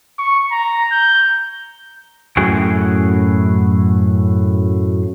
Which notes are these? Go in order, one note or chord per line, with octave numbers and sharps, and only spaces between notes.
C#6
A#5
G6
F#2 A2 F#4 G#4 G5